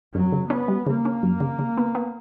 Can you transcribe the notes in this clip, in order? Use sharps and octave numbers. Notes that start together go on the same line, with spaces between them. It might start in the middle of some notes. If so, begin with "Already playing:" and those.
F#2 F#3
C#3
B3 C#4
G3
C#3 A#3
C#4
F#2
C#3
C#3
B3
B3